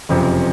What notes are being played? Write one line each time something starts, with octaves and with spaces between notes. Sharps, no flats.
F#1 F2 C3